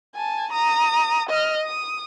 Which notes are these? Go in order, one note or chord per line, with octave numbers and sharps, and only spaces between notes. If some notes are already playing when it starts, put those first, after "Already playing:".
G#5 A5
A#5 D#6
D#5 F6
D#6